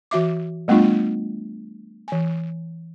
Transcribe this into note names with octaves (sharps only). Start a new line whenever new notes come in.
E3 F#4 E5 D6
G3 A3 B3 D4 F4
E3 G#5